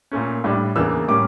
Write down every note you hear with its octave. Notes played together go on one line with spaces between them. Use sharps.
A#2 A3 C#4
A2 G3 D4
E2 C#3 E3 A#3 D4 E6
A2 G3 A#3 C#4 D6